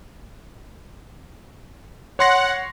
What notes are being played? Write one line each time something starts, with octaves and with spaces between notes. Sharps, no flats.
C#5 F#5 C6 A#6